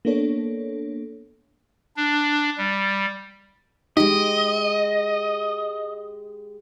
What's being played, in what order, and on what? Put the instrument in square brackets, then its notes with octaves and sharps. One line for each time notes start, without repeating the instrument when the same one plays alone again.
[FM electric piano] A#3 B3 D4 A4 C#5
[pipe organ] D4
G3
[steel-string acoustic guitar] G#3 G4 [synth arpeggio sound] D#4 [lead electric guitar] D#5